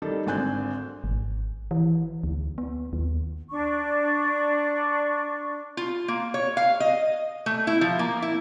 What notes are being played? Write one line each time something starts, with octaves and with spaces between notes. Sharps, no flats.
D#3 G3 A4
G#1 D3 C4 G#5 F#6 G6
G#1
E3
D2
B3
D#2
D4 C#6
F4
A#3
C#5
F5
D#5
A3
E4
F3
A#3
E4